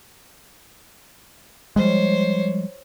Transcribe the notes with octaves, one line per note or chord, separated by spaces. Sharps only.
F3 G3 G#3 C5 C#5